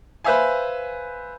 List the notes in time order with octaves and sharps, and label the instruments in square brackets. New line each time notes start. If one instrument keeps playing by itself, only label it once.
[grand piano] B4 C5 E5 F5 G#5